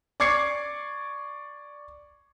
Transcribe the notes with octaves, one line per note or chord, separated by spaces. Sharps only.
D5 C#6 D6 G#6 C7 C#7